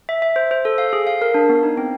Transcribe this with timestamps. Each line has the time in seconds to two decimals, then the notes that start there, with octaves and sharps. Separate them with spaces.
0.09 E5
0.22 E5
0.36 C5
0.51 C5
0.65 A4
0.78 F5
0.93 G#4
1.07 F5
1.22 A#4
1.34 D4
1.49 B3
1.63 D#4
1.77 C4